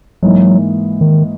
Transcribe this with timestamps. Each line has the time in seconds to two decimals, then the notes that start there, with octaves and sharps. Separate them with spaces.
0.23 G#2 E3 F#3 A#3 D#4
1.01 D#3